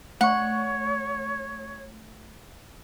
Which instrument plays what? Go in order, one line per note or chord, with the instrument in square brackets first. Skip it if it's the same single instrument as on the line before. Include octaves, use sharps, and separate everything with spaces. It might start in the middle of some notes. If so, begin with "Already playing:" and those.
[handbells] A3 C#6 [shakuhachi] C#5 [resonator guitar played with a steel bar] F#5